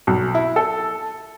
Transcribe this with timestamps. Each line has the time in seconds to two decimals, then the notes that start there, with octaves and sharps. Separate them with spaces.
0.07 B1
0.35 E4
0.56 A4